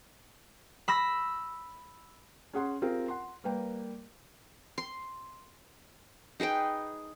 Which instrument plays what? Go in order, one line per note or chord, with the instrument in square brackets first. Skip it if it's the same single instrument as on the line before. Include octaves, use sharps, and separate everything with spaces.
[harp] B5 E6 A#6
[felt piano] C#4 G#4 F#5 C6
C4 F4 G4 G#4 A#4
F#5 C6
G3 A#3 A#4 B4 G5
[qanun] C6
D#4 G#4 B4 G5